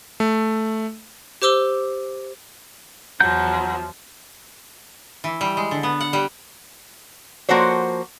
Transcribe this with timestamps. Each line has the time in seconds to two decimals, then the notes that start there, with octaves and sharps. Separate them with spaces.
0.20 A3
1.42 G4 C5 D6 E6 G7
3.20 E2 F3 F#3 F#5 A#5 G6
5.24 E3
5.41 G3
5.57 G#3
5.71 D3
5.83 B3
6.01 F#5
6.13 G3
7.49 F3 A#3 F#4 A4 C5 C#5